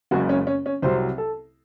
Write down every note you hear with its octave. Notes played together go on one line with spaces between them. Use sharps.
F#1 F#2 C#3 G#3 F#4
C#4
C#4
C#4
C2 C3 F#3 C5
A4